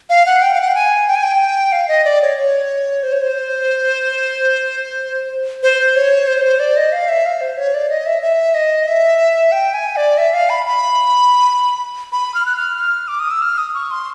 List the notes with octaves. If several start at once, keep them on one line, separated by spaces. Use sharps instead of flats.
F5
F#5
G5
F5
F#5
G5
G#5
G5
G#5
G5
F5
D#5
D5
C#5
C#5
C5
C#5
C5
C5
C#5
C5
C5
D5
D#5
F5
E5
F5
C5
C#5
D5
D#5
E5
E5
D#5
E5
G5
G#5
D5
E5
F5
B5
B5
B5
F6
F#6
F6
F6
D6
D#6
E6
F6
D#6
C#6
C6